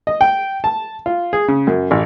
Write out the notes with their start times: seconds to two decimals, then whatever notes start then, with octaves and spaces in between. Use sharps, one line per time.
0.07 D#5
0.21 G5
0.64 A5
1.06 F4
1.33 G#4
1.48 C#3
1.67 F#2
1.91 A1